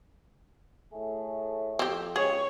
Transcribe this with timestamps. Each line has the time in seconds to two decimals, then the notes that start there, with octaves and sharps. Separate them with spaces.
0.93 A2 A3 G#4
1.79 F2 C4 G4
2.16 C#2 F#3 G4 G#4 C#5